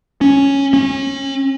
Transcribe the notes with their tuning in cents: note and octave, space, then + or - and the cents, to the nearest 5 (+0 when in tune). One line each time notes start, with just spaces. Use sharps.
C#4 +0
C#4 -30